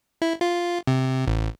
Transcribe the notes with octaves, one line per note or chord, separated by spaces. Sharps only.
E4
F4
C3
A1